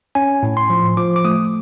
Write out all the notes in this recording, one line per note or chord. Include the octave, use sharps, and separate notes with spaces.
C#4 G#5
A2
C6
F3
F3 D6
D6
A3 D#6